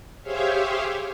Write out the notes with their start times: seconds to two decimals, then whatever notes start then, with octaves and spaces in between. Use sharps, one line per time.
0.22 G4 G#4 C5 C#5 E5 F5